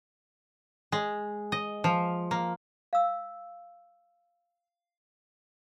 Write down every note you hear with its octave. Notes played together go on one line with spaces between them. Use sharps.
G#3
D#5
F3
A#3
F5 E6